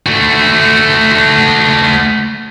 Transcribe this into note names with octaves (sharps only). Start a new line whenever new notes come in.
A3 F#4